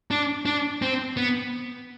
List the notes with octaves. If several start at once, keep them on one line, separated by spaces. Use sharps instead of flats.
D4
D4
C4
B3